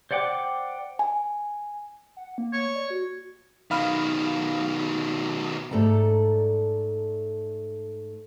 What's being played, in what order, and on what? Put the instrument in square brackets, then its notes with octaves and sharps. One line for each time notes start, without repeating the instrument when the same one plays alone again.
[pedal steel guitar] C5 D5 F#5 G5 D6
[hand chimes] G#5
[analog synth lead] F#5
A#3
[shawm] C#5
[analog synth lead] D5
F#4
[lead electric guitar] B2 D#3 [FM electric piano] F5 B5 F6
[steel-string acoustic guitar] G#2 A3 A4 D5 A#5